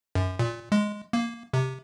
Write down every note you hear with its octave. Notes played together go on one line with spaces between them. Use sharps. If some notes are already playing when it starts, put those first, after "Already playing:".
F#2
A#2
G#3
A#3
C3